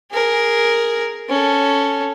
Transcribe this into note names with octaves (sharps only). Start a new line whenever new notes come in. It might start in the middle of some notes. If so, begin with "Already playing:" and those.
G#4 A#4
C#4 A4